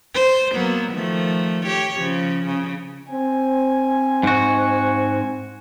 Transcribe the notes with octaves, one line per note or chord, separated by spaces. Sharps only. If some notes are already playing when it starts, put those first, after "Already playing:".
C5
F#3 A#3 B3
D#3 F3 A3
G4 C#5
C#3 F3
C#3
C4 G#5
G#2 F#4